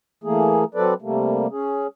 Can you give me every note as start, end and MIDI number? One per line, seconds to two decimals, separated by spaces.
0.24 0.64 52
0.24 0.64 57
0.24 0.64 58
0.24 0.64 68
0.75 0.94 54
0.75 0.94 60
0.75 0.94 69
0.75 0.94 71
0.75 0.94 74
1.02 1.47 48
1.02 1.47 55
1.02 1.47 57
1.02 1.47 58
1.51 1.87 61
1.51 1.87 68